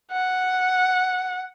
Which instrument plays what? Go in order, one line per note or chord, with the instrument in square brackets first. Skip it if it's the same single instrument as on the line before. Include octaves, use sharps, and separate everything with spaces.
[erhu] F#5